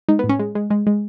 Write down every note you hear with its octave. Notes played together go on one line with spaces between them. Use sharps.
G#3 D#4
B3
A2
C#4
G#3
G#3
G#3
G#3